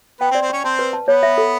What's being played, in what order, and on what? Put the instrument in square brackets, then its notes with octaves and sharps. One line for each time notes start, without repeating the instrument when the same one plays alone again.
[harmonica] B3 B4 [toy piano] G5
[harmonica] C4 C5
[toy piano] D5
[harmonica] C4 C5
[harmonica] C#4 C#5 [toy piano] C6
[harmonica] C4 C5 [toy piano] A5
[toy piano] B4
A5
[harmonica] B3 B4 [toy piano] C#5
[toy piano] E5
A4